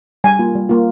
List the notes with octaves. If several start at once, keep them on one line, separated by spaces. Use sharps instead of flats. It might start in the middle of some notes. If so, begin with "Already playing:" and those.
G3 G#5
A#3 F4
G3
A#3 F4